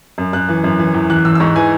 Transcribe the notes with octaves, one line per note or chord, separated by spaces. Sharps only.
F#2
F#2 F#6
E3
F#2
E3
E2
E2 F#6
E2 E6
E6
G#2 C#6
E3 G#5